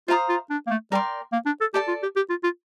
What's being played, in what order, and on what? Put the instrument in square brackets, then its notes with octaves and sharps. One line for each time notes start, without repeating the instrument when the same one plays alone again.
[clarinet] F4 [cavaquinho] C5 F5 A#5 D#6
[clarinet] F4
D4
A#3
A3
[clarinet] G3 [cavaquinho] A#4 D5 G5 C6
[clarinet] A#3
D4
A4
[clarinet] G4 [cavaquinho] A4 D5 A5
[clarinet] F4
G4
G4
F4
F4